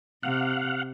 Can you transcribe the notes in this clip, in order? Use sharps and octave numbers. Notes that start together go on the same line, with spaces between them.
C3 F5 F#5